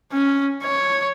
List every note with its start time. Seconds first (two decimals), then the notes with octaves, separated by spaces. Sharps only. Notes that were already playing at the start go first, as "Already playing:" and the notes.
0.13 C#4
0.63 C#5